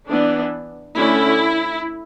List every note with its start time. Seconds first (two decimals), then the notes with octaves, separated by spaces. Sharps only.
0.08 E3 B3 D4
0.96 D3 A3 C#4 E4